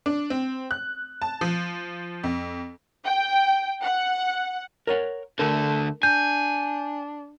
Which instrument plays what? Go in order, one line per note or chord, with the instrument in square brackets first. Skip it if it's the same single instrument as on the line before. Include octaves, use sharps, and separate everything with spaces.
[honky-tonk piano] D4
C4
F#6
A5
F3
F2
[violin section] G5
F#5
[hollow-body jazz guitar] A#4 C#5 F#5
[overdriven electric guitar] D2 D3 [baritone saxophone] A3 [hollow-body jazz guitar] A#4
[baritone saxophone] D4 [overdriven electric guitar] G#5 [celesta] G6